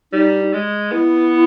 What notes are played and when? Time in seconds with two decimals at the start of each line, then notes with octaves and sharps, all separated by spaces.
0.13 G3 D#4
0.53 G#3
0.92 B3 E4